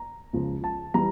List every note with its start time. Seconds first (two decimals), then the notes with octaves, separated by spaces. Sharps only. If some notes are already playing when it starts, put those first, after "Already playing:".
Already playing: A#5
0.33 C#2 C#3 F3
0.64 A5
0.94 E3 G3 A#5